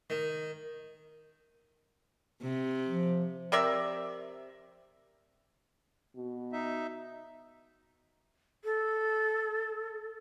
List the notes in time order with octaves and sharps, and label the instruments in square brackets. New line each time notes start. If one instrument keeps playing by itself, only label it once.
[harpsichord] D#3
[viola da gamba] C3
[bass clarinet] F3
[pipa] C3 A#4 D5 E5
[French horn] B2
[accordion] D#4 E5
[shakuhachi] A4